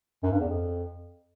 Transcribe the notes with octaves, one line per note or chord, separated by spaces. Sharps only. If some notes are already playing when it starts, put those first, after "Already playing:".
F#2
G2
E2
F2